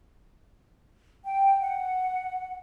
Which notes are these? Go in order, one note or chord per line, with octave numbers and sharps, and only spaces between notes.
G5
F#5